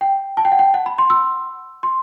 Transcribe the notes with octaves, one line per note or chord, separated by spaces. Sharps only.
G5
A5
G5
F#5
G5
F#5
B5
C6
E6
C6